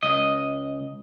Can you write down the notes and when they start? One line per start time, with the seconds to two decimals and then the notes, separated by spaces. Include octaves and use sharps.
0.03 C#2 D#5